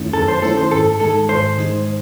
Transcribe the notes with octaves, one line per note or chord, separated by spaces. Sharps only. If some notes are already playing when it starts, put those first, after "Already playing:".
Already playing: F#2 D#3 A3 C#4 E4
F#2 A4
C5
D#3 A3 C#4 E4 A4
C5
G#2 A4
D#3 G#3 D#4 A4
G#2 C5
D#3 G#3 D#4